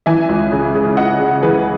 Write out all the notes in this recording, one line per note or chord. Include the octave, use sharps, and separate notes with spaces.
E3 E5 G#5
C#2
C#3
C#3
C#3 D#5 F#5
C#3
E3 G#4 B4